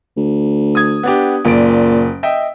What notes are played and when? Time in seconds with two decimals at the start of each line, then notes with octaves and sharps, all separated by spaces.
0.17 D2
0.75 D#6 G#6
1.03 B3 D4 G4
1.45 F#1 A#2 D5 D7
2.23 D#5 E5 G5